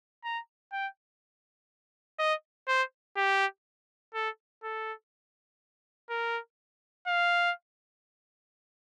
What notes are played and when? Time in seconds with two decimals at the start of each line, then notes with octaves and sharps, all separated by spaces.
0.24 A#5
0.72 G5
2.19 D#5
2.68 C5
3.17 G4
4.14 A4
4.64 A4
6.10 A#4
7.07 F5